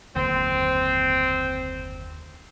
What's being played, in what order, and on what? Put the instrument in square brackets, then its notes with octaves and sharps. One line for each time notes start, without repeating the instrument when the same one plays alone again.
[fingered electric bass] F#1 D#2 D3 [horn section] C4